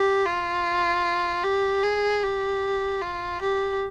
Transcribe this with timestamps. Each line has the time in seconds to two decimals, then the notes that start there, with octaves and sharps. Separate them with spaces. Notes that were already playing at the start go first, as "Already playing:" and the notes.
Already playing: G4
0.25 F4
1.44 G4
1.83 G#4
2.23 G4
3.02 F4
3.42 G4